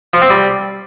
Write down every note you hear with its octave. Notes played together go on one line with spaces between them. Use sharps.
F3
C4
G3